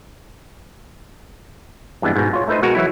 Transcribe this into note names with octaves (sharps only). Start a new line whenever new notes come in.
G2 E3 G#3 B3 D4
G#2 B2
F4 C#5
A3 D#4 B4 C5 D#5
B2 G#3 F#4 A#4
E3 F#3 E4